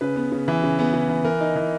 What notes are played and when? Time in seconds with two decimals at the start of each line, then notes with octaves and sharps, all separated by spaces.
0.01 C#3 B4
0.16 B3
0.32 C#3
0.48 E3
0.63 C#3
0.79 B3
0.93 C#3
1.09 E3
1.24 E3 A#4
1.41 D#4
1.56 E3